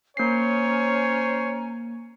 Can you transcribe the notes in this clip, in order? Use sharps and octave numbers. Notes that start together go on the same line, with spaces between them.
A#3 C#4 C5 C#5 G#5 A#5 C7